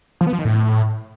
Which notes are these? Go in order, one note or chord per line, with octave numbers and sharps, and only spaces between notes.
F3
B3
F3
D#3
A2